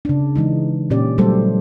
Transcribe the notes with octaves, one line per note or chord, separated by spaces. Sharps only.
C#3 D4
E3 G#3 D#4
A#2 C#4 G4 D5
F#3 G3 A3 A4 C5